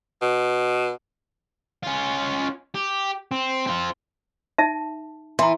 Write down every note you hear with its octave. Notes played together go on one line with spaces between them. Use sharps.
B2
C#4 F4
G4
C4
C4 F4
D#4 E5 A5
E3 A#5 C6